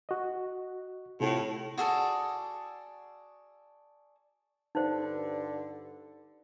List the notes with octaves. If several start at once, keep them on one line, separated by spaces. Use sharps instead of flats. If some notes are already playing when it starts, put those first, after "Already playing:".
F#4 D#5
A2 C3 F4
F#4 G#4 A4 D5
G2 D3 D#4 C5